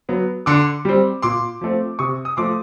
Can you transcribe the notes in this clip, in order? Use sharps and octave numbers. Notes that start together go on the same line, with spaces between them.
F#3 B3
D3 C6 D6
G3 C4
A#2 C6 D6
F3 A3 C4
C3 C#6 D#6
D#6
F3 A3 C6 D6